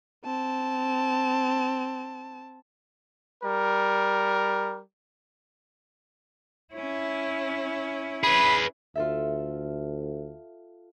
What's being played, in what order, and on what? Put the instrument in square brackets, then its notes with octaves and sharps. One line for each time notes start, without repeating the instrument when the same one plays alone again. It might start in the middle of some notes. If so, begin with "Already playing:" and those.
[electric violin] C4 A5
[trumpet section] G3 A#4
[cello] C#4 E4
[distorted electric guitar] G#4 B4 [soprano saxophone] B5
[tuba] D2 [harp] F4 A4 E5